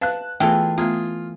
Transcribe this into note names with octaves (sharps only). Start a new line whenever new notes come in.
B4 F5 A5 F#6
E3 A3 B3 F4 G#4 A4 G5
A3 B3 F4 G#4 A#5